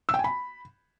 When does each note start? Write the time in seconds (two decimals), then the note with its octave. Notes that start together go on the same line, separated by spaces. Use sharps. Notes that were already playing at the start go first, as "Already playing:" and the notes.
0.09 E6
0.14 G5
0.19 G#5
0.24 B5